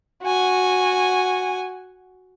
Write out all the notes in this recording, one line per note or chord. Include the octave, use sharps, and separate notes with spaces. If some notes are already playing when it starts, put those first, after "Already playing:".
F#4 G#5